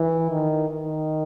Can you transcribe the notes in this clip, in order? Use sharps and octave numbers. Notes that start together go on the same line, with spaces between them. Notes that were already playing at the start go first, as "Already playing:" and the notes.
Already playing: E3
D#3
D#3